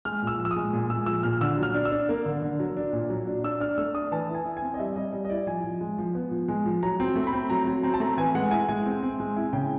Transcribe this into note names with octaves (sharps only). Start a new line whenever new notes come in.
G#3 F6
A#2 E6
F3
E6
D#6
G#3
A#2
G#3 E6
F3 E6
A#2 F6
D3 E6
F#3
F6
D4
E6
D4
A#3
D3
D3
F#3
D4
A#2
F#3
D4
D4 E6
D4 F6
A3 E6
D4 D#6
E3 A5
E4
G#5
E4
G#5
C4
D#5
G3 E5
G3 D#5
G3
D#5
E4 D5
F3 G#5
F3
G#3
F3
B3
F3
G#3
F3
F#3 A#5
C4
A3
B5
C4
F#3 A#5
F#3
C4 A#5
A5
A3 A#5
E3 G#5
G#3 F#5
E4 G#5
G#3 G#5
C4
C4
G#3
E4
C#3 G5